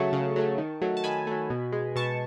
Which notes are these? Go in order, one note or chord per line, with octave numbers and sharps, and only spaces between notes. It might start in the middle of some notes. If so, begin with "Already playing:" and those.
Already playing: C#3 F#3 A3 A5 C#6
C#3
F#3 A3
D#3
F#3 A3
A5
D#3 G#5 B5
F#3 A3
B2
G#3
B2 A5 C#6